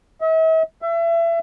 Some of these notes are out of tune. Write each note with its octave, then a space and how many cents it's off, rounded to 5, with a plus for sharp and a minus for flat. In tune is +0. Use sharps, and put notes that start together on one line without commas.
E5 -45
E5 +30